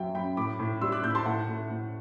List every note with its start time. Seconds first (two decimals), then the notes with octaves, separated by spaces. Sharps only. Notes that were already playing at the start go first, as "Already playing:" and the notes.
Already playing: F#2 F#3 E5 G5
0.15 F#2 G5 B5
0.37 A2 B5 D6
0.59 A2
0.81 G3 C6 E6
0.92 D6 F#6
1.04 A2 E6 G6
1.11 B5
1.15 A5 C6
1.26 A2 F#5 A5
1.48 A3
1.70 A2